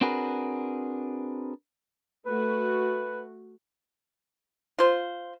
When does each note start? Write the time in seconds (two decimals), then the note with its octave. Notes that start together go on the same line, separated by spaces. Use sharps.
0.01 C4 D4 F#4 G#4 A#4 B4
2.26 A3 F#4 B4
4.78 F4 C5